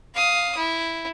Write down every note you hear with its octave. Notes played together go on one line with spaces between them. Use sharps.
F5 D#6
E4